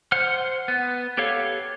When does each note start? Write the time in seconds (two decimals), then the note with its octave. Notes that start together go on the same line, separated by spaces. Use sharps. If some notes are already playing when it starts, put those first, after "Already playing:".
0.12 C5 F#5 F6
0.68 B3
1.17 B3 G4 A4 C#5 F5